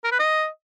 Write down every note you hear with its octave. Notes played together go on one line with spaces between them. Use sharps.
A#4
B4
D#5